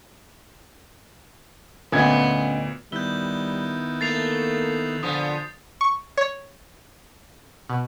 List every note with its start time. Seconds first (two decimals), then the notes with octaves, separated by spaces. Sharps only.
1.92 D2 A#2 B3 C#4 D#5 G#6
2.92 D#3 G3 B3 E4 G6 G7
4.01 A3 A#3 A6 C7 F7
5.03 A#2 D3 F3 B3 D#6
5.81 C#6
6.18 C#5
7.70 B2